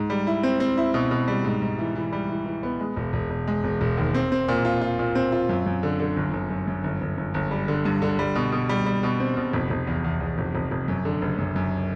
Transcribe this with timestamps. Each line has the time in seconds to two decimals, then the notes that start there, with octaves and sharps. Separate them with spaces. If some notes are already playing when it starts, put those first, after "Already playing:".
Already playing: G#2
0.10 G3
0.27 E4
0.43 C4
0.60 C4
0.77 E4
0.94 B2
1.11 B2
1.28 G3
1.45 G#2
1.62 G#2
1.78 E3
1.95 E3
2.12 G3
2.29 E3
2.46 E3
2.63 B3
2.80 G#3
2.96 E1
3.13 E1
3.30 E1
3.47 G#3
3.64 E1
3.81 E1
3.97 D#2
4.14 C4
4.32 C4
4.48 A#2
4.65 F4
4.81 F4
4.99 A#2
5.15 C4
5.32 F4
5.49 F#2
5.66 F#2
5.83 D3
6.00 D3
6.17 G1
6.33 G1
6.50 F#2
6.67 F#2
6.84 G1
7.01 G1
7.17 G1
7.34 G1
7.51 G3
7.68 D3
7.85 G2
8.02 D3
8.19 G3
8.35 B2
8.52 B2
8.69 G3
8.86 G3
9.03 B2
9.20 C4
9.37 B2
9.53 F1
9.70 F1
9.87 E2
10.04 E2
10.21 E2
10.38 F1
10.55 F1
10.71 F1
10.88 F#2
11.05 D3
11.22 F#1
11.38 F#2
11.56 F#2